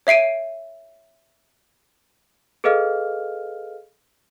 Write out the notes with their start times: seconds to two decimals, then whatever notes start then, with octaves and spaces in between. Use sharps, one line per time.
0.07 C#5 E5 C7 D7 D#7
2.64 G#4 A4 B4 D#5 F5 F6